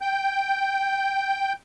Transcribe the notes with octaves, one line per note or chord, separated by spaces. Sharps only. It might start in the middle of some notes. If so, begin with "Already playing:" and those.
G5 G6